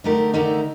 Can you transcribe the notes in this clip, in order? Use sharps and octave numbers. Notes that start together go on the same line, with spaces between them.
D3 A3 D#4 G4 A#4
D3 A3 D#4 G4 A#4